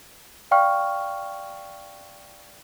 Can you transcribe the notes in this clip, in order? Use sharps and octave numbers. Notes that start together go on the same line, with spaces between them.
D5 F5 G5 C#6 F6